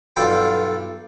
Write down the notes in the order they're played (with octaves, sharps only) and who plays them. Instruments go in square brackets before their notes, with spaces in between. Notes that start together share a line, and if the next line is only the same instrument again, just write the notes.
[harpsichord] B1 G2 F4 A4 G5 B5